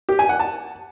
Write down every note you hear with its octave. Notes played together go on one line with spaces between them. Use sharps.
G4
G#5
F#5
A5